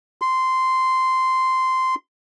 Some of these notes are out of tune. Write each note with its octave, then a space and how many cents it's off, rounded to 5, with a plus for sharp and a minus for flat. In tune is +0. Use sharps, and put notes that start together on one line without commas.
C6 -10